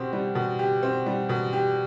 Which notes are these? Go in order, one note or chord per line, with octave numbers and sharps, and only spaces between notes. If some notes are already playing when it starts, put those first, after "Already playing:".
Already playing: B2 C4 G4
G3
B2
G4
C4
G3
B2
G4